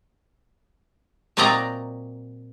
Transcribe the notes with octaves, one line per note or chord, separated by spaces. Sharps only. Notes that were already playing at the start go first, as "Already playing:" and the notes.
A#2 F#3 C4 D5 D#5 A#5